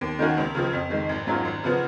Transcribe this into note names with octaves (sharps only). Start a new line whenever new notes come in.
D#2
D#3 A#3 C#4 F#4
C#2
C#3 F3
F2
D#3 G#3
G#1
G#2 F#3 C#4 F4
G#1
C#3 F3 B3